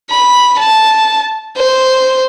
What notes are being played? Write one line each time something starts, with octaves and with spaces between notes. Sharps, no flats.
B5
A5
C5